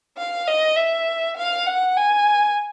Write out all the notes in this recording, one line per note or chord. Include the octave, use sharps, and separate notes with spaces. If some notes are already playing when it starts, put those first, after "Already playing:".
F5
D#5
E5
F5
F#5
G#5